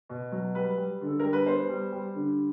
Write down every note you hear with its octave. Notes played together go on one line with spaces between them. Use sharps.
B2
F#3
G3 B4
G3
D3 A4
G3 A#4
B4
B3 C5
G3
G3
D3